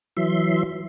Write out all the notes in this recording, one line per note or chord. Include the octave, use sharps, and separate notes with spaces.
E3 F#3 E5 C6